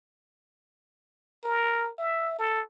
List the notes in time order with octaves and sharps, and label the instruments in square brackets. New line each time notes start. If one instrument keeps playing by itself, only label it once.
[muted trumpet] A#4
E5
A4